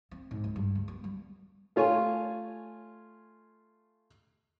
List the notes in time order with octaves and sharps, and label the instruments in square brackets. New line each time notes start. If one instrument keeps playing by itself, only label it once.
[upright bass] C4
G#2
C#2
G2
C#2
B3
G3
[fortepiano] A3 F4 C#5 G#5